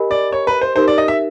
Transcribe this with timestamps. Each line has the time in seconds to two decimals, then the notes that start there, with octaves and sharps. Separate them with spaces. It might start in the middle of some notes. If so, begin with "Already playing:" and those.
Already playing: G4 A#4 D#5 G#5 B5
0.11 D5
0.32 C#5
0.47 B4
0.61 C5
0.76 D#4 G4 A#4 C5
0.88 D5
0.98 D#5
1.08 E5